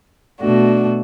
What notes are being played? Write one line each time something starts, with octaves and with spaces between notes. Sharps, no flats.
B2 A3 D4 F#4